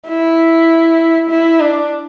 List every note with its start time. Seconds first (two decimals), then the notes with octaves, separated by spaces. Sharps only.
0.08 E4
1.30 E4
1.60 D4